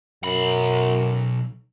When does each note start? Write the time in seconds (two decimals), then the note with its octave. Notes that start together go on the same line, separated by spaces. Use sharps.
0.24 B1 F#2 B5